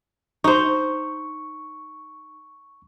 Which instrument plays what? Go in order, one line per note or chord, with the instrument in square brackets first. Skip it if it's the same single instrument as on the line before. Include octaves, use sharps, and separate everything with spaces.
[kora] D#4 C5 [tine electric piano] C#6